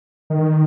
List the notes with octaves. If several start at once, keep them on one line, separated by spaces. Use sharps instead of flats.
D#3